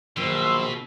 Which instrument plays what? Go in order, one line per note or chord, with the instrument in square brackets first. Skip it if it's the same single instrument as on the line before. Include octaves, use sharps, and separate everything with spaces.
[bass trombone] A#1 [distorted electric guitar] B2 [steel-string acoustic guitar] D#3 F#3 [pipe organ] C6 E6